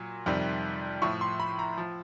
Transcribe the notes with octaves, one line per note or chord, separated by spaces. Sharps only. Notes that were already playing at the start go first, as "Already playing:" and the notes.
Already playing: A#2 F#3
F2 C3 D#3 G3
A2 F3 C#6
C6
B5
A#5
F3